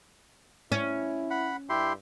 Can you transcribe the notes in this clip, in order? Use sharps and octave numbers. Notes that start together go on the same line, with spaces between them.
C#4 E4
F#5 B5
G2 E4 G4 C6